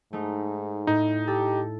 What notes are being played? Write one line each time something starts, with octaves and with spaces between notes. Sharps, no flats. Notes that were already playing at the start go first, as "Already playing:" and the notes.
G#2 A3 D#4
A2 D#4
G4 A4